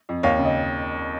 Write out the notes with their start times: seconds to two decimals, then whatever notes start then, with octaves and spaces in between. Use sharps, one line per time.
0.09 F2
0.23 D#2 C#5 F5
0.39 C#3
0.45 D#5